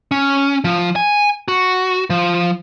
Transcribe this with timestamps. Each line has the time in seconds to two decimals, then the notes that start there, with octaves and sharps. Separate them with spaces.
0.11 C#4
0.64 F3
0.96 G#5
1.48 F#4
2.10 F3